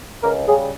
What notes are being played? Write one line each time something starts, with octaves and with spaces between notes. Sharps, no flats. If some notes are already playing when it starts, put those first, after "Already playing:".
C#2 A#4
C#3 G3 G#4